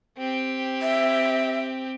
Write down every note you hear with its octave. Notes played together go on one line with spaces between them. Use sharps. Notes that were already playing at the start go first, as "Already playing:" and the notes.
C4 G4
E5